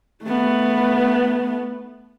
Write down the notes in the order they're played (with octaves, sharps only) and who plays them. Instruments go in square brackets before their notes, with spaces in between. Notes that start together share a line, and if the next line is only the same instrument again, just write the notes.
[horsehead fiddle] A3 B3